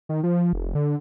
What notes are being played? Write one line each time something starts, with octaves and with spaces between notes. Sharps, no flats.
D#3
F3
F1
D3